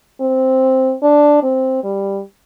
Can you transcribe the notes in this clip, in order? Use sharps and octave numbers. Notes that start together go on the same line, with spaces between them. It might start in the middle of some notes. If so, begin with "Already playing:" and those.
C4
D4
C4
G3